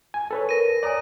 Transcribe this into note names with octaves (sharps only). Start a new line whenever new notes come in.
G#5
A4 B4 C#5
A#4 A#6 D#7
C#5 D5 G#5 A#5 D#6